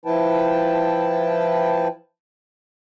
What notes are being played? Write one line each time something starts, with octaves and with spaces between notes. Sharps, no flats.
F3 E4 B4 G5 A5